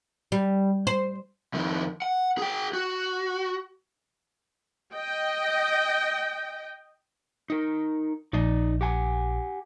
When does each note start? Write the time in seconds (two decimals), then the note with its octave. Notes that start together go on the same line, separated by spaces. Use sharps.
0.32 G3
0.87 C5
1.54 F2 D#3
2.02 F#5
2.38 G#4 G5
2.73 F#4
4.93 D#5 G5
7.50 D#4 A#4
8.33 A#1 D#4 D5 D#5
8.81 G4 F#5 G#5